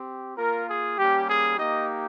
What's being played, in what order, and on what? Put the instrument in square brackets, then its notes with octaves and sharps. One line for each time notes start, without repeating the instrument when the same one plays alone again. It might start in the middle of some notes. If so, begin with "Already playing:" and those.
Already playing: [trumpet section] C4 G4
A#3 F4 A#4
G#4
G3 A#3 C#4 G4
G#4
A#3 D#4 G4 D#5